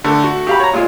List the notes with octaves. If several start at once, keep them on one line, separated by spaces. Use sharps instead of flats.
D3 A3
F#4
G4 F5 B5
C#5 A#5
A#2 G#3 F4